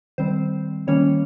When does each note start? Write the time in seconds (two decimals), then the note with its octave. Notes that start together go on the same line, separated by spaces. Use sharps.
0.18 D#3 G3 C4 C5
0.87 D#3 G3 A#3 C#4 C#5